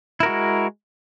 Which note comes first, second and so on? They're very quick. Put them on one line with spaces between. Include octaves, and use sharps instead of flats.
E4 A#4 F#4 G#3